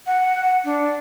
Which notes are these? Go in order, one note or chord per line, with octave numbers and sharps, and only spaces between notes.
F#5
D4